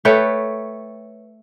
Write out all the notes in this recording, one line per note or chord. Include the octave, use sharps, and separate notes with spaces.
A3 B4 C#5 G5